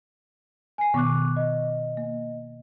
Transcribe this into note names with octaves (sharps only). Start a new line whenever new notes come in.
G#5 C7
B2 D#3 B3 C#6 D6 F#6
D#5
A#3